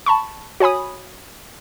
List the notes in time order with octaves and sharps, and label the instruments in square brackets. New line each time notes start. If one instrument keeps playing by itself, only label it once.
[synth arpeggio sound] A5 B5 C#6
F#4 C#5 G#5 B5 D#6